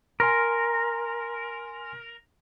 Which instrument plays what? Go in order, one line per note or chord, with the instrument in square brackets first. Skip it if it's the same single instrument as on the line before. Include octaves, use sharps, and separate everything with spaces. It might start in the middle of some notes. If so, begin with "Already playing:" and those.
[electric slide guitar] A#4 [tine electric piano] G#5 C6 F6